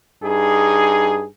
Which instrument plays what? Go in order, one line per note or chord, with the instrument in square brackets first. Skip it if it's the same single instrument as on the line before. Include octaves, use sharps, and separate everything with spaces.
[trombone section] G2 D#4 G#4